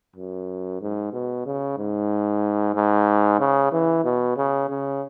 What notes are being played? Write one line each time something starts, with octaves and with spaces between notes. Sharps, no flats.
F#2
G#2
B2
C#3
G#2
G#2
C#3
E3
B2
C#3
C#3